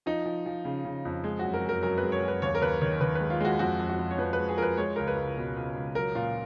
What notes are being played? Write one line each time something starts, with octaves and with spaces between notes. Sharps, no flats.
F3 D#4
F3
F3
C#3
C#3
F2
G#3
F#2 F#4
A#4
F#2
A#4
F#2 A#4
B4
G#3
C#5
F#2 B4
D#2 C#5
A#4
D#2 B4
D#3 C#5
D#3 B4
G#3 B4
F4
G#3 F#4
F2 F#4
F2
F#4
F2
C#5
F2 B4
B4
G#3
G#4
F3 A#4 B4
G#3 C#5
C#2 A#4
B4
C#2
B2
C#2
C#2
F#3 A#4
A#2 F4